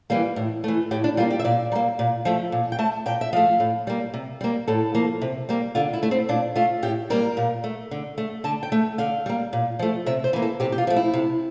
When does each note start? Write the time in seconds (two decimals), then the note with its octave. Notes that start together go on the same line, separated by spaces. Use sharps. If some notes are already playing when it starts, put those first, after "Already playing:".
0.10 E3 G3 A#3
0.36 A2
0.64 E3 A3
0.91 A2 G4
1.04 D4
1.17 G3 A#3 F4
1.31 G4
1.39 E5
1.44 A#2 D5
1.72 G3 A#3
1.99 A#2
2.25 F3 A3
2.52 A#2
2.72 G5
2.79 A3 A5
3.06 A#2 G5
3.21 E5
3.33 F3 A3 F5
3.60 A2
3.87 G3 A#3
4.14 C3
4.41 G3 A#3
4.67 A2 A4
4.95 F3 A#3
5.22 C3
5.49 G3 A#3
5.75 D3 F4
5.93 E4
6.03 A3
6.11 C4
6.29 A#2 D4
6.56 A3 F4
6.83 A2 G4
7.10 G3 A#3 A#4
7.37 A#2
7.64 A3
7.91 D3
8.18 A3
8.44 D3 A5
8.63 G5
8.72 A3
8.98 D3 F5
9.26 G3 A#3
9.53 A#2
9.79 F3 A3
10.06 C3 E5
10.24 C5
10.33 E3 A#3
10.42 A4
10.60 C3 G4
10.72 G4
10.78 F4
10.87 F3 A3
10.96 E4
11.13 C3